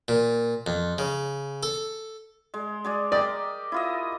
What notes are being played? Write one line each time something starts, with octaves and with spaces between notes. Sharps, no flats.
A#2
F2
C#3
A4
G#3
G#3 G#4 D5
G4 A#4 D5 D#5
E4 F4 D#5